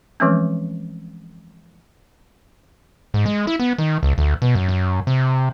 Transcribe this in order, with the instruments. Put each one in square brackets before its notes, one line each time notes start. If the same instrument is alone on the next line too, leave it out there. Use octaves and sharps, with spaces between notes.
[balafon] E3 F3 G#3 A3 C4 C#4
[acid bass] G#2
G#3
E4
B3
D#3
C#2
D2
B2
F#2
F#2
C3